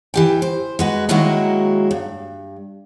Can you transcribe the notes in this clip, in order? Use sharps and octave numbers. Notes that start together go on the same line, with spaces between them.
E3 G4 G5
C5
G#3 F#4 B4
D#3 F#3 G#3 A#3 E4 F#4
G2